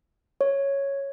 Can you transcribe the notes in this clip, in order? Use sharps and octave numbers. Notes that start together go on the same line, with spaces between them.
C#5